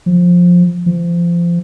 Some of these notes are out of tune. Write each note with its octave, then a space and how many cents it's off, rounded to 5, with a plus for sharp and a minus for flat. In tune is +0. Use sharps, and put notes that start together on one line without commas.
F3 +15
F3 -25